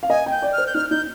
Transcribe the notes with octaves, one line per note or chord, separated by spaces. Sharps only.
F5
D#5 G#5
G5
G6
D5
F6
C5
G6
D#4 F6
D#4 G6